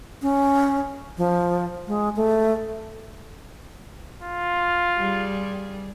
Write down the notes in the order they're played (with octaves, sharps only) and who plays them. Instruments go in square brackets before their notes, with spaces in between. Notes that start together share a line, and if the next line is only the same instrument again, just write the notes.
[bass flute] C#4
F3
G#3
A3
[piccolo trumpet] F4
[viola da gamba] G3 G#4